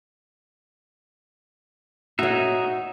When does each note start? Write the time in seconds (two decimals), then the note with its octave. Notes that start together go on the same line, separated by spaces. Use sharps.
2.19 D#4 F#4 C#5 E5